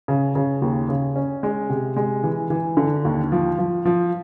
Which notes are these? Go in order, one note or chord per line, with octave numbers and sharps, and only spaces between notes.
C#3
C#3
D#2
C#3
C#4
G#3
C3
G#3
E3
E3
D3
D#2
F3
F3
F3